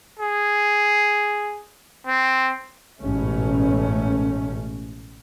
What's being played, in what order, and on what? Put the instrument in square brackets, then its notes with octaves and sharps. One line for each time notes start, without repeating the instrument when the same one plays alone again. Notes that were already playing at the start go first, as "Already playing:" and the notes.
[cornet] G#4
C4
[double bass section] A1 G#2 B2 A3 C#4